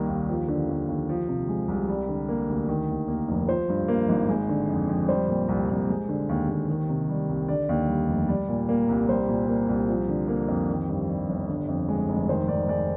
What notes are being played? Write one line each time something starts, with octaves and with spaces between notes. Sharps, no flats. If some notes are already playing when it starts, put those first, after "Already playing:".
Already playing: C2 D#3 G3 A#3
D#2
F3
D3
D#2
D#2
F3
C3
G#3
C2
G3
D3
A#3
D2
D#3
D#2
A#3
F1
F3 C5
G2
A#3
G#1
G#3
D3
F2
F2
G3 C5
A#2
C2
C2
G#3
D3
D#2
D#2
D#3
C3
G3
C2
D3 D5
D#2
G3
F1
G3
A#2
A#3
C2
G3 C5
A#2
A#3
C2
F3
D3
A#3
F2
D#3
G2
G3
G1
D3
F2
G#3
F1
D#3 C5
G#2 D5
G#3 D5